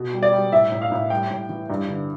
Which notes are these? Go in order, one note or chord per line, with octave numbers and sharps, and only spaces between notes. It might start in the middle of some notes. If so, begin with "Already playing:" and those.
Already playing: B2
G3
D5
G3
A2 E5
A2
F5
A2
G3 G5
A2
E3
G2
D3